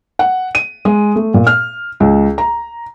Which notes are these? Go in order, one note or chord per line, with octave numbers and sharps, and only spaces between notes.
F#5
D#7
G#3
A3
A#2
F6
C#2
A#5